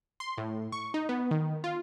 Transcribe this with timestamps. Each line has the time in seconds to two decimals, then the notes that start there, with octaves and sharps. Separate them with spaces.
0.20 C6
0.38 A2
0.72 C#6
0.94 D#4
1.09 B3
1.31 D#3
1.64 F4